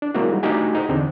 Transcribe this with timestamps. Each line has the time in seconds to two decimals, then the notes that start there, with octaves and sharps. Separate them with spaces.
0.02 D4
0.15 F#3 G#3 A#3 C4 E4 F#4
0.31 G3 D#4
0.43 A3 D4 D#4 F#4 G4 G#5
0.75 D#4 G#4 C5
0.89 E2 D3 C4 D4